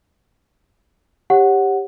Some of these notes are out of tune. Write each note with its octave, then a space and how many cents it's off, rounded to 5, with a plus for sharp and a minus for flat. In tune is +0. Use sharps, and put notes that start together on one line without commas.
G4 +10 C#5 -20 F#5 +0